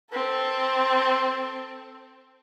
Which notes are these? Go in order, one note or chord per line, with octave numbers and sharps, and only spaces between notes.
C4 A4